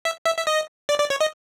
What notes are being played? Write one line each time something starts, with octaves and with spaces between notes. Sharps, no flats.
E5
E5
E5
D#5
D5
D5
C#5
D#5